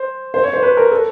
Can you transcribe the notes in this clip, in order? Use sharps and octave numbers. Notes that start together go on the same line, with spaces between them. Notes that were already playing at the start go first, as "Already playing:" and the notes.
Already playing: C5
C5
C#5
C5
B4
A#4
A4